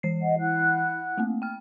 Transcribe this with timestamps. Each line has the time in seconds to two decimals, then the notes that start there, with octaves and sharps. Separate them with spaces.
0.03 E3 C7
0.22 D#5 F#5
0.40 E4 F#5 F#6
1.18 A3 A#3 C4
1.42 G5 F6